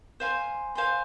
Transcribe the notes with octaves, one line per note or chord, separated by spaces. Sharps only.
C5 F5 G#5 C6
C5 F5 G#5 C6